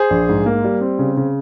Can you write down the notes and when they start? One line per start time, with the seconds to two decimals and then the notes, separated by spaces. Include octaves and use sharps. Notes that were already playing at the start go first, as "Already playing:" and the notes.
Already playing: G#4 C5
0.10 A#1
0.29 G#2
0.46 A#3
0.64 G3
0.81 C4
0.99 C#3
1.17 C#3